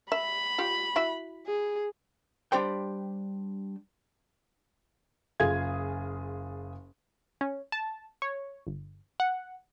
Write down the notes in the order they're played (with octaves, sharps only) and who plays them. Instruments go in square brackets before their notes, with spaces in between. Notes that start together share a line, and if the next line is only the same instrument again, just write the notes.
[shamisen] E5 [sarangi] B5
[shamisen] F4 G4
E4 F#4 E5
[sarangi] G#4
[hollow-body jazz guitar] G3 D4 G4 C5 D5 G5
[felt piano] F#1 F4 G#4 F5 G#6
[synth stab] C#4
A5
C#5
G1
F#5